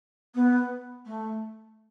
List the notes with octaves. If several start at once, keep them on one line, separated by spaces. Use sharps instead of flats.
B3
A3